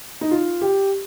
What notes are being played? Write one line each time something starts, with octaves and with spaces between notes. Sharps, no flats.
D#4
F4
G4